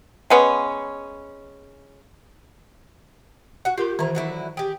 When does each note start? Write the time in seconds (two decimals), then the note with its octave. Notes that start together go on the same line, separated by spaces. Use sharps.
0.30 G#3 B3 C#4
3.65 F#4 F#5
3.78 F4 G4 A#4 C6
3.99 D#3 E3 E4 C5 A#5
4.15 D3 F#3 E4
4.57 G4 G#4 G5